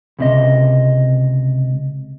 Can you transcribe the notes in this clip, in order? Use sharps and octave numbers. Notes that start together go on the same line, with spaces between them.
C#2 C3 D#5